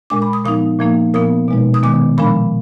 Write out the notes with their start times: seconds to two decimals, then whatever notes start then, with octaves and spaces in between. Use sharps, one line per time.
0.10 A#2 G#3 D4 D6
0.22 B5
0.33 D#6
0.45 A#2 F3 B3 D#4 D#6
0.79 A#2 F3 A#3 D#4
1.14 A#2 F3 B3 D#6
1.48 B2 G#3 D#4
1.74 D#6
1.83 D#3 G#3 B3 D6
2.18 A#2 F3 G#3 D4 B5